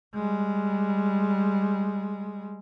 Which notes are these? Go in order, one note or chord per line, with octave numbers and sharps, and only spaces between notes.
G3 G#3